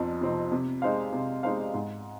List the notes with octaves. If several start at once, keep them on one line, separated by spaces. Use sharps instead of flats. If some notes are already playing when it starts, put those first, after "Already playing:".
Already playing: F2 F3 C4 D#4
C3 F3 C4 D#4
C3
G#3 D#4 C5 F5
C3
G#3 D#4 C5 F5
G#2